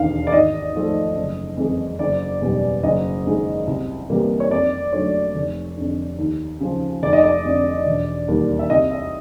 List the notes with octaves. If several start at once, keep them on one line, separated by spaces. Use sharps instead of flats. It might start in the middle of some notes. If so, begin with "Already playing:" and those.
Already playing: E1 D#2 D3 F5
D5
G#1 D#5
G#2 F3 A3
F#1
F2 C#3 E3 G#3
F#1 D5
E2 B2 G3
F#1 D#5
F#2 D#3 G#3
C2
C3 E3 G3 A#3
C#5
F2 D5
D3 F#3 A3 C#5
F1
F2 D3
D#2
C#3 F3
F1 D5
D#5
D5
F2 D3
E1
D#2 D#3 G3 A#3
E5
C2 D#5
E5